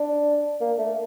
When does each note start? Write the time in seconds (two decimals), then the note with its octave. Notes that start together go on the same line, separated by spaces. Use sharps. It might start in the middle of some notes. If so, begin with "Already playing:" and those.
Already playing: D4
0.61 A#3
0.79 A3